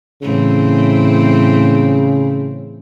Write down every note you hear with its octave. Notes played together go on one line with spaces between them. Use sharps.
A2 C#3 E3 C4